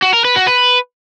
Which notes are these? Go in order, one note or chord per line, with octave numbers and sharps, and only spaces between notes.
F#4
A#4
B4
F#4
B4